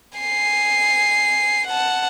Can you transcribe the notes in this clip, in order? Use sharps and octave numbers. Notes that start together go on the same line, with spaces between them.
G#5 C7
F#5 A5